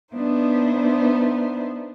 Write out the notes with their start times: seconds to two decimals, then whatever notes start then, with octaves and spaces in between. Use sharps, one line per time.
0.14 B3 D4 D#4 C5 E5